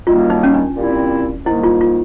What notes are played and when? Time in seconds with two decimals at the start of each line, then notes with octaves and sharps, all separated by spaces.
0.07 F#2 D#3 G3 A#3 F4
0.30 D#4
0.43 C#4
0.54 D4
0.77 A#2 G3 C4 E4
1.46 G#2 D#3 G3 A#3 E4
1.63 F4
1.81 F4